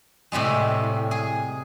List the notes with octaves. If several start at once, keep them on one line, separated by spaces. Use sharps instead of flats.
A2 C3 G3 G#3
G#4